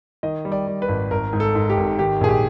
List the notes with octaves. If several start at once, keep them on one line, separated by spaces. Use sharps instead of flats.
D#3 D#5
G3
D5
G3
B4
G#1
G#1 A#4
G#2
A4
G#2
G4
G#1
D#3 G4
A#1 G#4
G4